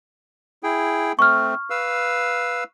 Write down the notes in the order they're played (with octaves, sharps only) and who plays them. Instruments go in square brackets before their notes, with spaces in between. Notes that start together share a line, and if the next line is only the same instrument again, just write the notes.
[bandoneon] E4 G#4 G5
[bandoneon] A3 C4 [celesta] C#6 F6
[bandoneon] B4 F5 E6